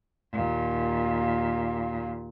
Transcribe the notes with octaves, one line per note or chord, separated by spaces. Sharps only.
D#2 A#2